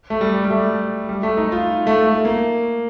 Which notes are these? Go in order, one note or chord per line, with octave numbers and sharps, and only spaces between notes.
A3
G3
G3
A3
G3
A3
D#4
F4
A3
A3
A#3